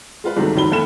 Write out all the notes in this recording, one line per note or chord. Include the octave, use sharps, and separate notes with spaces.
G#3 F4 B4
C2 G#2 C3 D#3 F#3 A3
F1 G#2 D#3 F#3 B5 G7
D#2 A3 B5 E7